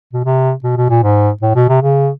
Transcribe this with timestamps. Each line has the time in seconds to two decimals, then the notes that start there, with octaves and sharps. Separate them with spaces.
0.13 B2
0.25 C3
0.64 B2
0.77 B2
0.90 A#2
1.03 G#2
1.42 A2
1.55 B2
1.69 C3
1.82 C#3